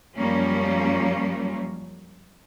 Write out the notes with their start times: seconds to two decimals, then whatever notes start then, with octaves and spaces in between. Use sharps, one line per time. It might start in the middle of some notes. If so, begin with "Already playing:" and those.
0.16 F#2 F3 G3 A#3 C#4